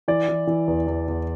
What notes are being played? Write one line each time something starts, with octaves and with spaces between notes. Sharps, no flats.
E3 D5
E3
E3
E2
E2
E2